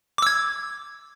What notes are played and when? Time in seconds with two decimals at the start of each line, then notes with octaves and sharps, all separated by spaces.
0.18 D6
0.22 E6
0.27 G#6